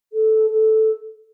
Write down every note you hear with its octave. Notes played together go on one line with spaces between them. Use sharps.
A4
A4